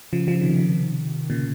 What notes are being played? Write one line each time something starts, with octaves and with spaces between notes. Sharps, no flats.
C#3 F3
C#3 F3
C3 D#3
C3 D#3
A#2 C#3